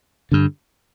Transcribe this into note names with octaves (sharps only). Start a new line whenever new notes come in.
G2 D3